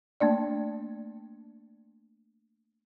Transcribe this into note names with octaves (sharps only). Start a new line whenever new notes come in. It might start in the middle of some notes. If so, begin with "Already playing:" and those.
A3 A#3 D4 D5